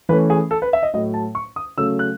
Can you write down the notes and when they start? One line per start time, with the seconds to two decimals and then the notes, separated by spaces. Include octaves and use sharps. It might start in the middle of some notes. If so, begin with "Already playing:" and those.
0.09 E3 A3 C#4 B4
0.30 G#4
0.51 A4
0.62 B4
0.73 E5
0.83 D#5
0.94 A2 F#3 A3 D#5
1.14 A5
1.35 C#6
1.56 D#6
1.77 C#3 F#3 A3 C#4 E6
1.99 F#6